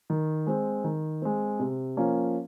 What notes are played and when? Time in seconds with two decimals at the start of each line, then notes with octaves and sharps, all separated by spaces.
0.10 D#3
0.47 G#3 C4
0.84 D#3
1.22 G#3 C4
1.60 C3
1.97 F3 A#3 C#4